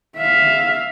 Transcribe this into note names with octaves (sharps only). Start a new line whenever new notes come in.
E5 F5